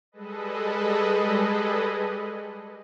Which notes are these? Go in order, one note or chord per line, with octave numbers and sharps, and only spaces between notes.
G3 G#3 G#4 A4 B4 D#5